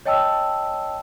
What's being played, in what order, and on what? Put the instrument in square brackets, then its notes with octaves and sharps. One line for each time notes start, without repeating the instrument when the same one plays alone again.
[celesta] C#5 D#5 G5 A5 E6